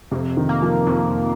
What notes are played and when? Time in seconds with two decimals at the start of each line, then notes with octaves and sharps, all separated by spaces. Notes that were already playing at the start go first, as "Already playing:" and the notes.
0.11 F2 C3
0.37 D#3
0.49 A#3
0.62 F3
0.87 F2